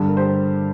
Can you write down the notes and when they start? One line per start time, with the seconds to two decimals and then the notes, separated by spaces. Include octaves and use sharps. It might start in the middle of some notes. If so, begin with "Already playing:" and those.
Already playing: G2 D3 G3
0.08 A#4
0.17 G4 C5